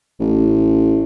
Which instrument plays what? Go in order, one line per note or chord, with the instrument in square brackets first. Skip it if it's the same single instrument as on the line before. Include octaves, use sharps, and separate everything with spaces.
[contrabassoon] A1